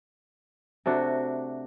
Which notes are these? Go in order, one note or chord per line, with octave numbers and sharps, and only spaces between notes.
C3 A3 D4 F#4